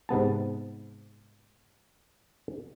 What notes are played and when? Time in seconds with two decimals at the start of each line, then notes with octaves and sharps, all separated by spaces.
0.09 G#2 C3 B3 A5